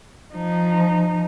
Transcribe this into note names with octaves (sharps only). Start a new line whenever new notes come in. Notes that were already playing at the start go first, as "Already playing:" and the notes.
F3 D#4